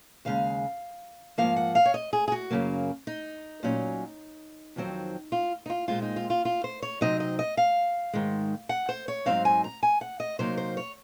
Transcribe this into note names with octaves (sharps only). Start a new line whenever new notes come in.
D#2 C#3 G#3 F5
G#2 F3 A#3 F5
F#5
F5
C#5
D#5
G#4
G#4
F#4
F#2 C#3 F#3 A#3
D#4
A#2 F#3 C#4
F2 D#3 F#3 C4
F4
D#4
F4
A#2 G#3 C4 F4
D#4
F4
F4
F4
C5
C#5
C3 F#3 C4 D#4 D#5
D#5
D#5
F5
G#2 D#3 G#3
F#5
C5
C#5
G#2 F#3 C4 D#4 F5
G#5
A#5
G#5
F#5
D#5
C3 F#3 A#3 D#4 C5
C5
C#5